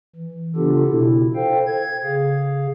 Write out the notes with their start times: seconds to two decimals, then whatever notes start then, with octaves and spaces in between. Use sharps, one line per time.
0.16 E3
0.56 C#3 B3 D4 F4 G4 A4
0.88 B2 E4
1.35 A4 C5 F5 G5
1.67 G#6
2.04 C#3 G#4 F5